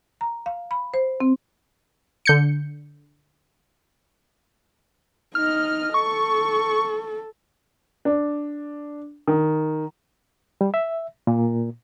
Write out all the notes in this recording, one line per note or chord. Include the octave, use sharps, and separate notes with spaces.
A#5
F5
B5
C5
C4
D3 G6 C#7
D#4 D#5 F6
A4 C#6
D4
D#3
G3
E5
A#2